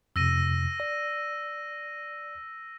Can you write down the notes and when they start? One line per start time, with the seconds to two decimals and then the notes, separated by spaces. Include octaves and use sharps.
0.16 F2 C3 E6 A#6 D#7
0.80 D5